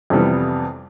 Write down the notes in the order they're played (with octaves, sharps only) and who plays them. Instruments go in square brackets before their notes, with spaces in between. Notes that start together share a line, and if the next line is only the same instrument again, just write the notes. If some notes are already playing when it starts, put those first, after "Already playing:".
[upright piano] F2 C3 E3 G3 B3